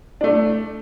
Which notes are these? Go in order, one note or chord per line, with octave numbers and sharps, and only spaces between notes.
A3 D4